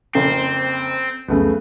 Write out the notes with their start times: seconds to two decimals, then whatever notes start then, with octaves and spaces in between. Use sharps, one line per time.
0.15 F#1 F2 C4
1.28 C2 F2 C#3 F#3 A3 B3